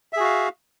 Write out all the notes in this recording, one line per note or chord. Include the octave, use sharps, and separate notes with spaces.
F#4 G#4 E5 F5